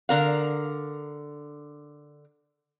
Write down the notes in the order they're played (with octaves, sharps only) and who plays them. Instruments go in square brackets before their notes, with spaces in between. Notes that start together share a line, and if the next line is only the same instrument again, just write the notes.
[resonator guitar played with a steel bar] D3 A#4 F5